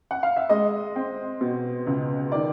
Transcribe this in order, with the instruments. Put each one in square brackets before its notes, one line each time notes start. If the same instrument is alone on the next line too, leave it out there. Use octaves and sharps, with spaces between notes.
[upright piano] F#5
F5
E5
G#3 D#5
C4
B2
C#2
D#3 D5